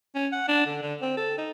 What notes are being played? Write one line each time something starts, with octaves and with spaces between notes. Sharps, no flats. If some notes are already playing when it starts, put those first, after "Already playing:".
C#4
F#5
D4
D3
D3
C4
A4
D#4